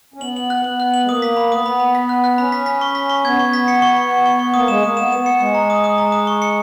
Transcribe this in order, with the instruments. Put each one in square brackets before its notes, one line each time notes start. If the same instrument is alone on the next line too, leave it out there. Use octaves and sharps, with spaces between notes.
[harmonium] C#4
[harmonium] B3 [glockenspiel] F#7
[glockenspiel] F#7
F#6
[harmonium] B3 [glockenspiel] F#7
[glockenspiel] F#6
F#7
[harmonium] G#3
[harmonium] A#3 [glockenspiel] D#6
[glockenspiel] B6
B5
[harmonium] B3 [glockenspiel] D#6
[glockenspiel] B5
B5
B6
F#6
F#6
[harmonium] C#4 [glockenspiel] B5
[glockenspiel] B6
B6
C#6
B6
C#6
[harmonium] B3 [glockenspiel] G#6
[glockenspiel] C#6
B6
C#7
C#6
C#6
C#6
C#6
C#6
[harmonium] A#3 [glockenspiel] D#6
[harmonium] G#3 [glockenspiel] E7
[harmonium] A#3 [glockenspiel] D#6
[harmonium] B3 [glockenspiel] E7
[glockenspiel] E7
[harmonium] B3
[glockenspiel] C#7
[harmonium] G#3 [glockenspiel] C#7
[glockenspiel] A#5
D#6
D#6
A#5
D#6
C#6
C#7